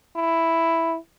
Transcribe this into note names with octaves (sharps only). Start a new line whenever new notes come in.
E4